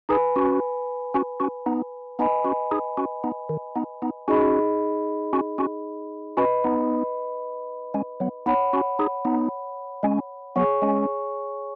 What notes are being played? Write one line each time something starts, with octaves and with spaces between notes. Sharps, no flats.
D#4 G#4 B4 G#5 B5
C#4 F#4
C#4 F#4
C#4 F#4
B3 D#4
B3 D#4 B4 D#5 G#5 B5
C#4 F#4
D#4 G#4
C#4 F#4
B3 D#4
D#3
B3 D#4
B3 D#4
C#4 D#4 F#4 G#4 D#5 B5
C#4 F#4
C#4 F#4
C#4 F#4 B4 D#5 B5
B3 D#4
G#3 C#4
F#3 B3
B3 D#4 C#5 F#5 B5
C#4 F#4
D#4 G#4
B3 D#4
G#3 C#4
F#3 B3 G#4 C#5 G#5 C#6
G#3 C#4